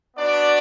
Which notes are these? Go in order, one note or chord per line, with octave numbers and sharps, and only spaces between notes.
B3 D4 F#4 D5